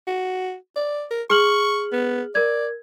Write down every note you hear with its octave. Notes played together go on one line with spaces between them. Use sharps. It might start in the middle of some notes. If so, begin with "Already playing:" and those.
F#4
D5
A#4
G#4 C#6 F6 F#7
B3
A#4 D5 G#6